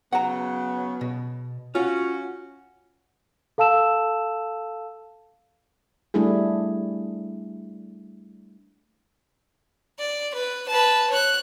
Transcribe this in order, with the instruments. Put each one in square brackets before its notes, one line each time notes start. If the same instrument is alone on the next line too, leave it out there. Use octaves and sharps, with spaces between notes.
[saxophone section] C#3 F#3 B3 [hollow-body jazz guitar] F#5 A#5
[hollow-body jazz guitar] B2
[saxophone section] C#4 F#4 [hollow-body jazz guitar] F4
[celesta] A4 F5 A5 E6 E7
[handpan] G3 A3 D4 E4 G#4
[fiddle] D5
B4
B4 A5
C#5 F#6